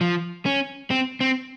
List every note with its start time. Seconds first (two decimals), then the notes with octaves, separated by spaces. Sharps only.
0.01 F3
0.46 C#4
0.91 C4
1.21 C4